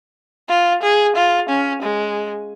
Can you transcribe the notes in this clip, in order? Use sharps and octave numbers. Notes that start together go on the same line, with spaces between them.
F4
G#4
F4
C#4
G#3